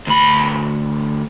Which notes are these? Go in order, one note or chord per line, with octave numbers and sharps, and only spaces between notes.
D2 B5